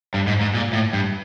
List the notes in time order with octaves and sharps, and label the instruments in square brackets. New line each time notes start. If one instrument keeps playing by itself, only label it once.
[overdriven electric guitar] G2
G#2
G#2
A#2
A2
G2